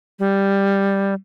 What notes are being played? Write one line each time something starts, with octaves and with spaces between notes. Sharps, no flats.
G3